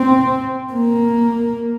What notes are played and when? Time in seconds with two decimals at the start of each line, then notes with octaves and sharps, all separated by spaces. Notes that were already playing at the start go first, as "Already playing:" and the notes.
Already playing: C4
0.73 A#3